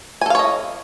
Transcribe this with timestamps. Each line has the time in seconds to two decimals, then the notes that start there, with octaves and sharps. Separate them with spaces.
0.21 G#5
0.26 A4
0.30 F5
0.35 C#5
0.39 D#5